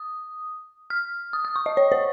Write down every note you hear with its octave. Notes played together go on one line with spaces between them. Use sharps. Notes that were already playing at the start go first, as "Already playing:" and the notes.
Already playing: D#6
F6
D#6
D#6
C#6
D#5
C#5
C5